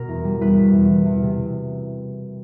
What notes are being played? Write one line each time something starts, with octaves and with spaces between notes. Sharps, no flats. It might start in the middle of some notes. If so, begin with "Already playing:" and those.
Already playing: B2 A#4
E2
G3
E2 B4
B2
E2
E3
E2
C3